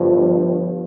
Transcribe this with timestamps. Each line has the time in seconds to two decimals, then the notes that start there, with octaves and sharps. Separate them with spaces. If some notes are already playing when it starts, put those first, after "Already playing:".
Already playing: G1 G2 F3